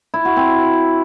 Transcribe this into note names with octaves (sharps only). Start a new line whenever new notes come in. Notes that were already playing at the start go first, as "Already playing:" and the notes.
E4
F#4
C4